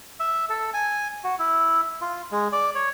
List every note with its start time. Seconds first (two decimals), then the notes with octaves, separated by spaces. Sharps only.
0.20 E5
0.49 A4
0.74 G#5
1.24 F#4
1.39 E4
2.01 F4
2.32 G#3
2.52 D5
2.75 C#5